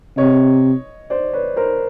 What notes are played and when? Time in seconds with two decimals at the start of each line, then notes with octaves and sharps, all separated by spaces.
0.17 C3 C#5 D#5
1.10 C5 D5
1.33 B4 C#5
1.56 A#4 C5